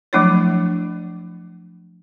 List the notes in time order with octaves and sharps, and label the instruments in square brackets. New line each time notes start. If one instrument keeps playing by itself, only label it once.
[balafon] F3 F#3 A3 D4 E4 C#5